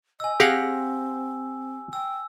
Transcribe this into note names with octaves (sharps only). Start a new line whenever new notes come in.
D#5 G#5 E6
C4 G4 G#4 F5 F#5 A#6
G5 E6